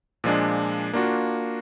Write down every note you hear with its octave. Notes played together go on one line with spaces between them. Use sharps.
A#2 F3 G#3 D4
A#3 D4 F4 F#4